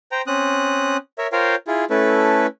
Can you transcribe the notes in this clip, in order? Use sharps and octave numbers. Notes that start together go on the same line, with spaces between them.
C5 G5 A#5
C4 C#4 D#6 F#6
A#4 C#5 E5
F4 A#4 C5 C#5 F5 G5
E4 F4 G#4
A3 C#4 E4 A4 B4